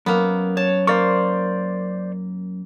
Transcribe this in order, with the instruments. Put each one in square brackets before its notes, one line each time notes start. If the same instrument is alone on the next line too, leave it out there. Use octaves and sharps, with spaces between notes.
[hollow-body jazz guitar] F#2 [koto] A#3 B3
[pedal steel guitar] C#5 [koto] A5
[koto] A#3 [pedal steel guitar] C5 D5 C#6